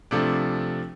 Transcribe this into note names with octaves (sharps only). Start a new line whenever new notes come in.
C3 F3 A3 D4